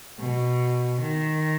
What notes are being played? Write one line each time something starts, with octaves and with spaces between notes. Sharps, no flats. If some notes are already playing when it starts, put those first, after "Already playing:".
B2
D#3